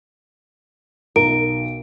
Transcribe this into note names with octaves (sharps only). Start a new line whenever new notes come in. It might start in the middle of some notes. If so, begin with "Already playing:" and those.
B1 A#4 D7